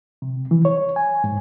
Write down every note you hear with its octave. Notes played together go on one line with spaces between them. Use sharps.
C3
E3
C#5
G#5
G#2